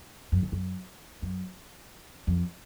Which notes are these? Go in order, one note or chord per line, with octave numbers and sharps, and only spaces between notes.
F#2
D#3
F#2
F#2
F2